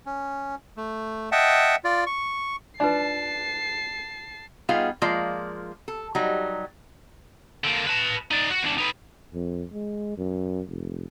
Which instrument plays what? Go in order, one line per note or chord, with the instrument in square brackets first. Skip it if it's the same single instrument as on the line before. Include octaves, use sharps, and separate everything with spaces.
[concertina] C#4
A3
D#5 E5 F#5 G5 A5
F4 D5
C#6
[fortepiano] D4 [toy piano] D#4 F4 B4 [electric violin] A5 C7
[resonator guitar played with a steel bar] G3 B3 D#4 F4 G#4 F5
F3 G#3 A#3 F4 D5
A4
F#3 G3 D#4
[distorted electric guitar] D3 A#3
B4 A5
D#4 D5
F#4
E2 D4
D#4 B4
[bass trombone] F2
G#3
F#2
F1